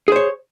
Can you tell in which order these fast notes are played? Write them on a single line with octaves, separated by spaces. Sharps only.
G#4 C5 C#5